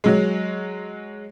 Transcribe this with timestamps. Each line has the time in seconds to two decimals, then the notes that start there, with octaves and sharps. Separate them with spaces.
0.04 F#3 G#3